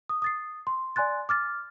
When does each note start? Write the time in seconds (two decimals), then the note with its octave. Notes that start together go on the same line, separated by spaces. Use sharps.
0.09 D#6
0.22 D#6 A6 C7
0.67 C6
0.96 D5 G#5 C6 F#6 A6
1.29 D6 F6 A6